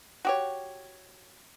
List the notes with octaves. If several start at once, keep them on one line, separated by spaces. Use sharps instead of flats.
F#4 G4 C#5